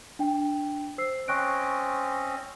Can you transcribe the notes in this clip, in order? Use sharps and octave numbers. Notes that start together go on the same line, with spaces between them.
D4 G5
C5 E6 C7
C4 C#4 D#5 C#6 F#6 D7